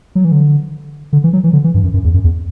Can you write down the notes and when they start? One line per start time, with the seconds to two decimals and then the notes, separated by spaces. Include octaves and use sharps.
0.15 F#3
0.25 E3
0.32 D3
1.13 D3
1.24 E3
1.33 F#3
1.44 E3
1.53 D3
1.64 E3
1.74 G2
1.84 F#2
1.94 F#2
2.04 E2
2.14 F#2
2.24 E2